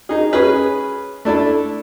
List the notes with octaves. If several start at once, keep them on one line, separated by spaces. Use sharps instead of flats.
D#4 G#4
C#4 G#4 B4
A3 D4 E4 A4